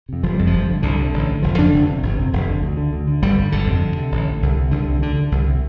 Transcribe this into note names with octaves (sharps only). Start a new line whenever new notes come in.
F2 C3
F1 F3
F2 C3 G3
F3
G1
G2 D3
C2 D3
C3
A1
A2
F1 F3
F2 D3 D4
F1
F2 C3
G1
F2 C3
F1
F2 D3
D2
D3
D2
D3
G1 G3
G2 D3
G1 D3
F2 C3
D2
C3
A1
A2
C2
C3
C2 D3
C3
D2 D3
D3
C2
C3